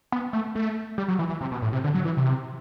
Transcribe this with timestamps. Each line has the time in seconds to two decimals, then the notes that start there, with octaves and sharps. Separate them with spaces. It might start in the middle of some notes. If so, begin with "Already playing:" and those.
0.12 B3
0.33 A3
0.55 A3
0.98 G3
1.08 F#3
1.19 E3
1.30 E3
1.41 C3
1.52 B2
1.62 A2
1.73 C3
1.84 D3
1.94 F#3
2.05 E3
2.17 C3